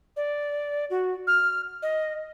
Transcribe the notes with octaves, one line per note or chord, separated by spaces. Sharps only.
D5
F#4
F6
D#5